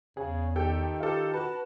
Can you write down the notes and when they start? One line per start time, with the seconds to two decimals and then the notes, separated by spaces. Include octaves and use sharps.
0.17 E2 C#3 G#4
0.56 D#3 G4 A4 G5
1.00 F4 G4 A4
1.34 F#4 B4 A5